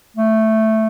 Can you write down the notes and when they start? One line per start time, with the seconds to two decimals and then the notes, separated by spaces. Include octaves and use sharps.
0.17 A3